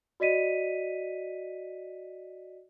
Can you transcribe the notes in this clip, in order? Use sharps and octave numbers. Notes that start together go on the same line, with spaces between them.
F#4 D5 D#5 B6 D#7